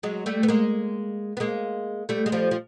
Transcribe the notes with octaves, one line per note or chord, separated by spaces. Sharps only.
F#3 G#3
G3 A3
B3
G#3 A#3
B3
G#3 A#3
G3 A3
G#3
F3 G3
F3